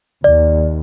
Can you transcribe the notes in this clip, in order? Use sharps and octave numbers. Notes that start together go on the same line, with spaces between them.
D#2 D5